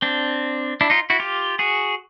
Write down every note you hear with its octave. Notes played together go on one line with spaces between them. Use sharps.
C4 D4
D4 E4
D#4 F4
E4 F#4
F4 G4
F#4 G#4